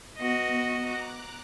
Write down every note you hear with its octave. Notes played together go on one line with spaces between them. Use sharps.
B3 F#4 D#5
A#5 D6 F#6